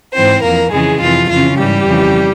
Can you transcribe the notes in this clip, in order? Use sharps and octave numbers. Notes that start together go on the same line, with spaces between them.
G#2 E3 C4 C5
F2 E3 A#3 A#4
F2 C#3 E3 G#3 G#4
F2 C3 E3 F4
F2 C#3 E3 F4
G#2 E3 G3 G4
F2 C#3 E3